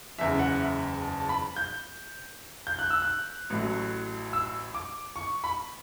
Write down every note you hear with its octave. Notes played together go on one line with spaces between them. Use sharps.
F#1 E2 C#3 E5
F#5
E5
A5
A5
B5
G6
G6
F#6
E6
F#6
A1 A2 F#3
E6
D6
C#6
B5